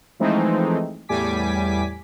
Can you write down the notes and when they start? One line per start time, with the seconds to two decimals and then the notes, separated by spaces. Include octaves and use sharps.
0.20 E3 F3 G#3 A3 C4 D#4
1.09 E2 A2 G3 G#5 D6 B6